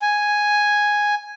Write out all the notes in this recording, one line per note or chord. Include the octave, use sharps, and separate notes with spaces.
G#5